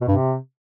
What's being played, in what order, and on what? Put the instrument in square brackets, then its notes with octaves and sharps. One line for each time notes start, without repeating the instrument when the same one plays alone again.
[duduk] B2
[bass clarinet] G2 [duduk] C3